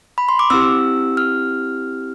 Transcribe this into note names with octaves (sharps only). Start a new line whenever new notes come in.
B5
C6
D6
C4 E4 G4 E6
F6